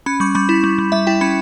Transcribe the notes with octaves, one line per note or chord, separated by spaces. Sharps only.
C#4 B5
G3 C#6
G3 B5
E4
G3
G3
G3 E5
E4 G5
C#4 B5